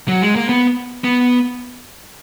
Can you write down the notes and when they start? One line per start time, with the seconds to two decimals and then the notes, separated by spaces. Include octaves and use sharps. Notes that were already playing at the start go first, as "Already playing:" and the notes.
0.08 F#3
0.22 G#3
0.36 A#3
0.49 B3
1.04 B3